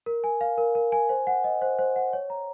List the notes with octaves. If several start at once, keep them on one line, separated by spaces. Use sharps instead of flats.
A#4
G#5
F5
A#4
A#4
G#5
C5
F#5
D#5
C5
C5
F#5
C#5
A#5